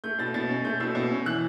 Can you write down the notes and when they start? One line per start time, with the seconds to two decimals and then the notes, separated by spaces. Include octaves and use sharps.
0.04 A3 G6
0.19 B2 A6
0.34 B2 A6
0.49 C#4
0.65 A3 G6
0.80 B2 E6
0.95 B2 E6
1.10 C#4
1.26 E3 F#6